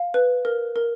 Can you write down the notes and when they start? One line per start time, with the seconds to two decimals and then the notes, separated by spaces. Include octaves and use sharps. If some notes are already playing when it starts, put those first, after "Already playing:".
Already playing: F5
0.14 B4
0.45 A#4
0.76 A#4